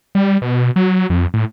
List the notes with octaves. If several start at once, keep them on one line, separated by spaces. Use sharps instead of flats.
G3
B2
F#3
F2
A2